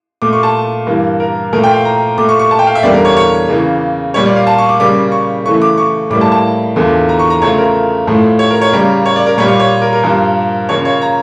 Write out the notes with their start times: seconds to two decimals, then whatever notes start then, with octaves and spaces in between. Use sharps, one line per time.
0.22 A#2 A3 D6
0.33 C#6
0.43 A5
0.87 G2 E3 A#3
1.20 A#4
1.52 A#2 F3 A3 A#4
1.64 G5
1.74 F5
1.85 A#5
2.18 A#2 A3 D6
2.29 C#6
2.39 C#6
2.51 A5
2.59 G5
2.67 F5
2.75 E5
2.83 E2 D3 G3 A#3 D5
2.94 A#4
3.05 C#5
3.17 C#5
3.49 C#3 E3 A#3
4.14 A#2 G3 A#3 C#5
4.26 D5
4.36 F5
4.47 A5
4.58 C#6
4.69 D6
4.80 C#3 G3 A#3 D6
5.12 C#6
5.45 C#3 E3 A3 C#6
5.62 D6
5.78 C#6
6.10 A2 G3 A#3 D6
6.21 A5
6.32 A5
6.76 E2 D3 F3 A#3
7.09 A#5
7.19 C#6
7.30 A#5
7.42 C#3 F3 A3 C#5
7.58 A#4
8.07 A2 F3 A3
8.39 C#5
8.50 A#4
8.62 C#5
8.72 C#3 G3 A#3 A#4
9.06 C#5
9.16 D5
9.27 A#4
9.38 A#2 G3 A#3 C#5
9.48 C#5
9.60 C#5
9.82 A#4
9.93 A#4
10.04 G2 F3 A#3
10.69 C#3 F3 A#3 C#5
10.85 C#5
11.02 A#5